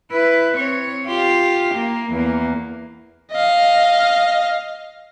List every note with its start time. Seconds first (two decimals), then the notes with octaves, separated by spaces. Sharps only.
0.11 E4 B4
0.57 C4 C#5
1.06 F4 G4
1.75 A#3
2.12 E2 A#3
3.32 D#5 F5